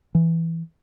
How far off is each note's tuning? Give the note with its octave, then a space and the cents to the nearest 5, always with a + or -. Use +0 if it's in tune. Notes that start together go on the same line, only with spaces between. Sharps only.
E3 +5